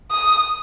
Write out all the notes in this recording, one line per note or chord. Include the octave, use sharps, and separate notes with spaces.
D#6